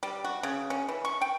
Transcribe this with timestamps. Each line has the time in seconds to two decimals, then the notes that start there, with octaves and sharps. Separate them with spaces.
0.03 G3
0.24 F#4
0.43 C#3
0.70 C#4
0.89 E3
1.05 C#6
1.21 G5